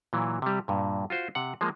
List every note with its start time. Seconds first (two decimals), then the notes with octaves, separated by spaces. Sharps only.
0.13 A#2 E3 F#3
0.42 C3 G3
0.68 G2 A#2
1.10 F4 F#4 C5
1.35 C3 F#5
1.61 F3 G#3 A#3